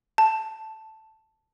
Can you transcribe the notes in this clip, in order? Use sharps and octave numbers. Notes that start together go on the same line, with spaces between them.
A5